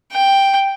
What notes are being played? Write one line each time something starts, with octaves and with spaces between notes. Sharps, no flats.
G5